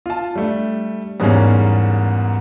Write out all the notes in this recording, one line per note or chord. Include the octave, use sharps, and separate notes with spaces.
F4 A5
G3 A3 D4
E2 G#2 G3 A#3 C#4